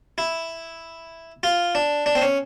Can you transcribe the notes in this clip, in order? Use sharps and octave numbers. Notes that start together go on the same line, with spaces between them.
E4
F4
D4
D4
C4
C#4